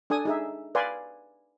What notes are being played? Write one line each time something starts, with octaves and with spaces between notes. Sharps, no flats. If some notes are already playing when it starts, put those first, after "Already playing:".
D4 A4 G#5 D#6
D#4 G#4 E5
B4 D5 F5 G#5 C6